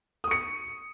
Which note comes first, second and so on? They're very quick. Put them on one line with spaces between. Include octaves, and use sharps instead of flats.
D#6 C#6 C#7